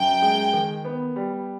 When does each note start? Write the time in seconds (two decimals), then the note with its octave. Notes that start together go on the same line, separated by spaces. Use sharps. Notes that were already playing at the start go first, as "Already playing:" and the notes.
Already playing: F#2 G5
0.22 G#3
0.53 D#3
0.85 B3
1.16 G3